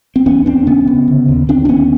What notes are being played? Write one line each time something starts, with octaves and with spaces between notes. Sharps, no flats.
C4
E2 B3 C#4
E2 C4 D4
C#3 B3 C#4
C#3
D3
D#2
D#2 C4 D4
D4
D#2 B3 C#4